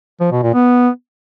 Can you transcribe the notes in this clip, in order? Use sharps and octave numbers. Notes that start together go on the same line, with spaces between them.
F3
B2
A#2
B3